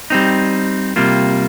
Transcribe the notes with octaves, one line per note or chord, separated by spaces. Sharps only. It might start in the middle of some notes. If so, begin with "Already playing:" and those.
G3 C4 D#4
C3 G3 A#3 F4